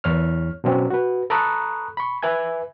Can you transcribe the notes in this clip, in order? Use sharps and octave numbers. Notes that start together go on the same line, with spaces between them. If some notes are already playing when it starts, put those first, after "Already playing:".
E2 C#5 F6
B2 F#3 C4 C#4
F#4 B4
A4 A#5 B5 C#6 D#6 F#6
B5 C#6
B4 E5 G#5 G#6